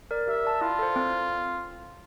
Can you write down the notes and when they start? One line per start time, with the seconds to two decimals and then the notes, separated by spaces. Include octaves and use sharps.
0.11 A#4 D5
0.27 G4 E5
0.45 D5 A5
0.61 E4 F4
0.79 A4 C5
0.96 C4